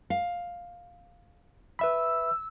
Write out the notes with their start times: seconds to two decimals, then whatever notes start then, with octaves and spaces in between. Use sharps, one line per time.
0.10 F5
1.79 B4 E5 B5 E6